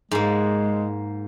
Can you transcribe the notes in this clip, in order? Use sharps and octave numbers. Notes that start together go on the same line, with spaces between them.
G#2 G#3 A#3